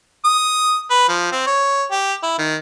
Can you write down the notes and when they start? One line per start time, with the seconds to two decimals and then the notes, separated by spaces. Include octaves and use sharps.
0.25 D#6
0.90 B4
1.09 F3
1.32 C4
1.47 C#5
1.91 G4
2.23 E4
2.38 D#3